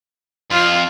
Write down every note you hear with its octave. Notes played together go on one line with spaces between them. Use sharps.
F2 F4